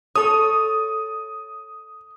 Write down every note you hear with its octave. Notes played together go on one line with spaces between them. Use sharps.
A4 C#5 D#6